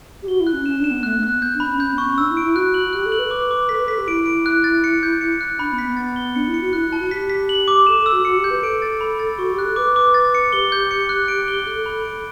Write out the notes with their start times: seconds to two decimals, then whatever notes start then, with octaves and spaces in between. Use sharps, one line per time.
0.22 G4
0.27 F#4 G7
0.40 E4
0.47 F#6
0.53 C#4
0.66 C#4 E7
0.79 D4
0.84 E7
0.91 B3
1.03 A3 F#6
1.16 B3
1.23 F#6
1.28 B3
1.42 G6
1.54 D4
1.60 B5
1.67 C#4
1.80 C#4 G6
1.93 B3
1.98 C#6
2.05 C#4
2.17 D4 E6
2.31 E4
2.37 D7
2.43 E4
2.55 F#4 F#6
2.74 F#7
2.87 F#4
2.93 G4 F#6
3.06 A4
3.12 F#7
3.19 B4
3.31 D6
3.51 D6
3.69 A4 B6
3.79 B4
3.88 A4 B6
3.98 G4
4.07 E4 D7
4.26 D7
4.46 F#6
4.64 A6
4.84 C#7
5.03 G6
5.21 C#7
5.41 F#6
5.59 D4 B5
5.72 B3
5.78 B6
5.85 B3
5.97 A6
6.16 G7
6.35 D4 C#7
6.48 E4
6.54 C#7
6.61 F#4
6.73 E4 F#6
6.89 E4 A5
6.99 F#4
7.11 G4 B6
7.30 B6
7.49 F#7
7.68 D6
7.87 A4 E7
8.00 A4
8.06 E6
8.12 F#4
8.25 F#4 C#7
8.38 G4
8.44 G6
8.50 B4
8.63 A4 D7
8.82 A6
9.01 B5
9.19 A6
9.38 F#4 C#6
9.52 G4
9.59 F#6
9.65 A4
9.76 B4 D6
9.96 D6
10.14 A6
10.35 C#7
10.53 G4 G7
10.72 G6
10.91 C#7
11.09 F#6
11.28 D7
11.48 G7
11.66 A4 F#6
11.86 B5
12.05 D7